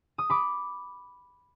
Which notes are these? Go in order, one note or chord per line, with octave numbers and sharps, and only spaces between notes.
D#6
B5 D6